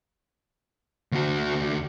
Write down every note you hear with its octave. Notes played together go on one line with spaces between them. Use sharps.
D2 F#4